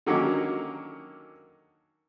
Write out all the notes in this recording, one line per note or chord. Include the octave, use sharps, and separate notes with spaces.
D3 D#3 F#3 A#3 C#4 D#4